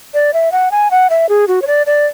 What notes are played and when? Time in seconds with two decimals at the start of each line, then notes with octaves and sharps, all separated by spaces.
0.14 D5
0.34 E5
0.52 F#5
0.71 G#5
0.91 F#5
1.10 E5
1.29 G#4
1.48 F#4
1.62 C#5
1.67 D5
1.86 D5